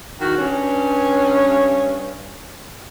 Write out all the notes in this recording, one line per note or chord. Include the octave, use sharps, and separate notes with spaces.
E2 D#3 F#4
G2 C#4